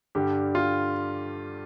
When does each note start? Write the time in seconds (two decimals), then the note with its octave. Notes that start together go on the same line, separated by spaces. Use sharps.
0.15 G2 D3 G3 G4
0.55 F4